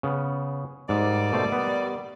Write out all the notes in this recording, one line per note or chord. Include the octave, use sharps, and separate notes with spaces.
C#3 B3
G#2 D#3 G3 D5
B2 A3 C5
B3